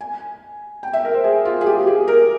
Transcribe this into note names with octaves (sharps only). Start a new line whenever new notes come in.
G#5
G5
E5
A#4
C5
G#4
F4
G#4
G4
G#4
A#4